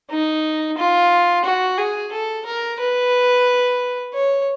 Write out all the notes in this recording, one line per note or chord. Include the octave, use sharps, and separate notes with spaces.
D#4
F4
F#4
G#4
A4
A#4
B4
C#5